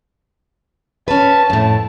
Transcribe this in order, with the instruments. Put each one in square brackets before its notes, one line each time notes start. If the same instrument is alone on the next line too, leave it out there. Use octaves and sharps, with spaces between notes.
[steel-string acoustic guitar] C#4 B4 [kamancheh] A5
[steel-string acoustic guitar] F2 A2